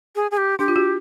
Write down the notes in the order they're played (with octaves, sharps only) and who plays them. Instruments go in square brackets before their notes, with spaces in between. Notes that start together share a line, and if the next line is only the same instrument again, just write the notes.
[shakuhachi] G#4
G#4
G4
[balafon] D4 [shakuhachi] G4
[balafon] F4
F#4